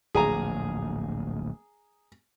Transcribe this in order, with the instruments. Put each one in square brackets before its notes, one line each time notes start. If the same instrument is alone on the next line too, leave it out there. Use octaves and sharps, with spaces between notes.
[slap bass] D1 A#1 [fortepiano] G#4 G#5 A#5